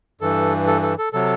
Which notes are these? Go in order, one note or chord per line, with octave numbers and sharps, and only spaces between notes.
G2 E3 A4
A4
A4
A4
C3 F#3 A4